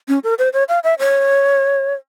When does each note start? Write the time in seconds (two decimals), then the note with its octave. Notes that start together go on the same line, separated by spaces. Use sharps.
0.08 C#4
0.24 A#4
0.39 C5
0.53 C#5
0.69 F5
0.84 E5
0.99 C#5